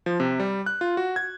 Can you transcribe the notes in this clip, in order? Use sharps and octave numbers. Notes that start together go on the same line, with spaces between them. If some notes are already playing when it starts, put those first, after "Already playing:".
F3
C3
G3
F#6
F4
F#4
G#6